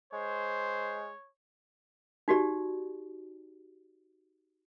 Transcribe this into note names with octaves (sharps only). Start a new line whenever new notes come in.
G#3 C5 C#5
D#4 F#4 G4 D5